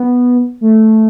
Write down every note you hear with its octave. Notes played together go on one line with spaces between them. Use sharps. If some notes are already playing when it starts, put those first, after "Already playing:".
Already playing: B3
A3